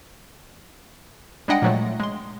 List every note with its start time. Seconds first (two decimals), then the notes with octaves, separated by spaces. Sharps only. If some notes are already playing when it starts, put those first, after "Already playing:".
1.48 G3 G#3 D4 D#5 F#5 G5
1.62 A#2 F3 F#3 G#3 A3
2.00 G#3 C6